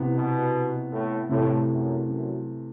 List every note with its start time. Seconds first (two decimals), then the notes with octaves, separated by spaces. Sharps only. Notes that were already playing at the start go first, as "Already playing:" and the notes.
Already playing: C3 E3 B3
0.15 B2
0.92 A2
1.29 A2 C3 E3 A3
1.69 F#2
2.06 F#2